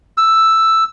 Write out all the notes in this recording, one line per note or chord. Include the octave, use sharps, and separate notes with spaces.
E6